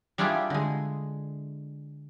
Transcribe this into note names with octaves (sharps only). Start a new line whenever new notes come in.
G3 D4 E4 F4 G4 G#4
D3 G#3